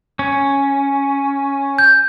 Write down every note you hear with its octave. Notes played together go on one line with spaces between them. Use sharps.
C#4
G6